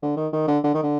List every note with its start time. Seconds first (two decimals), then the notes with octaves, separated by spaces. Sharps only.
0.02 D3
0.17 D#3
0.33 D#3
0.48 D3
0.64 D3
0.74 D#3
0.83 D3